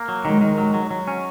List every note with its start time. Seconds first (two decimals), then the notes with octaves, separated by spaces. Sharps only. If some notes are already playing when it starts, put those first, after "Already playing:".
Already playing: A#3
0.08 F#3
0.25 D#3 G#3
0.41 D#3
0.58 F#3
0.74 F#3
0.91 F#3
1.07 C#4